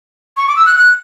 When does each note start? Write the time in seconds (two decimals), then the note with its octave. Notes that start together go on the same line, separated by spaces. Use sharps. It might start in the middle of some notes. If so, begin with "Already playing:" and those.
0.37 C#6
0.48 D6
0.56 E6
0.66 F#6
0.76 F#6